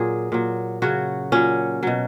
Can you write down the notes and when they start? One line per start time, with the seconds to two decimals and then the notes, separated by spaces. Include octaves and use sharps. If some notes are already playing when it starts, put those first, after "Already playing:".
Already playing: A#2 F#3 G#4
0.32 A#2 F#3
0.82 C#3 F#3 F#4
1.32 A#2 F#3 C#4
1.83 B2 F#3